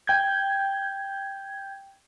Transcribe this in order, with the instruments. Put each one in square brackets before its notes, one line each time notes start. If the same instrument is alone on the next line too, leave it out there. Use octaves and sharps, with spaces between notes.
[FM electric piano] G5 G6 G#6